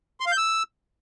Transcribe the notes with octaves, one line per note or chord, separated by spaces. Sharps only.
C6
F5
G6
E6